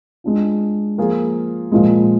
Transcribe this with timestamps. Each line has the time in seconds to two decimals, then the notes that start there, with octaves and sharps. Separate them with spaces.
0.24 G#3 D4 F4
0.98 F3 A#3 F4 G#4
1.72 A#2 F3 G#3